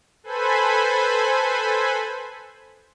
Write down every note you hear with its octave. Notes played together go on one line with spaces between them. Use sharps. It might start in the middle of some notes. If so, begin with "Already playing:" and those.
A4 B4 C5 G#5 B5